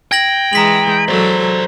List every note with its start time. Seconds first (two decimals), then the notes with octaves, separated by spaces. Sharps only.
0.12 G5 G#6 A#6 F#7
0.53 E3 G#3 A#5 B6 F#7
1.08 F#3 A4 C5 D5